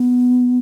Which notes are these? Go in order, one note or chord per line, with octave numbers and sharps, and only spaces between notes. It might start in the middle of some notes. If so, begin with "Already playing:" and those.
Already playing: B3